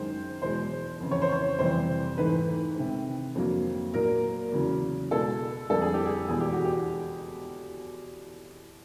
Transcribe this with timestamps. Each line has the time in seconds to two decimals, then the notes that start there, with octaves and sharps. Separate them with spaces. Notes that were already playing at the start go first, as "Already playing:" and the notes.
Already playing: F#2 D#3 G#3 C5
0.42 E2 B2 G#3 C5
1.00 F2 C#3 E3
1.11 C#5
1.22 C5
1.32 C#5
1.59 F2 C3 E3 G3 C5
2.17 G#2 E3 A3 B4
2.76 C3 D#3 G#3
3.35 F2 D3 F#3 A#3
3.94 A#2 F#3 A#3 A#4
4.52 E2 C#3 F#3
5.11 B2 G#3 A4
5.70 F2 D3 G3 A4
5.81 G#4
5.94 G4
6.06 G#4
6.28 E2 B2 G#3 G#4
6.40 G4
6.53 F#4
6.65 G4